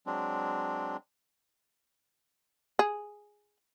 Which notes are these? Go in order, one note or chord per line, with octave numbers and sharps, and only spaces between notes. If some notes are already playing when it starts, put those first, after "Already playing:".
F#3 G#3 C4 D4
G#4